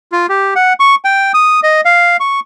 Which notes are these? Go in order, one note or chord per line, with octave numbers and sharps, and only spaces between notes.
F4
G4
F#5
C#6
G5
D#6
D#5
F5
C#6